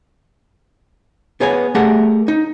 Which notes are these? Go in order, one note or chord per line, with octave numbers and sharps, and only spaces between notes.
B3 G#4 C#5 G#5
A3 G4 G#4 A#4 F#5 A5
D#4